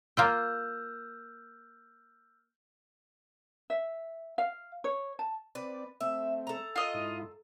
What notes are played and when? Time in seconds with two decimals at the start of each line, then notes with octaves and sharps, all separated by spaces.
0.17 A#3 F4 G5 E6 F6 G6
3.70 E5
4.38 F5
4.84 C#5
5.19 A5
5.55 C4 B4 D5
6.01 A3 C4 E5
6.47 A4 A#5
6.76 F4 D#5
6.94 G#2 E4